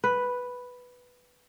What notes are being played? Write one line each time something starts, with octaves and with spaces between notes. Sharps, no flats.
B4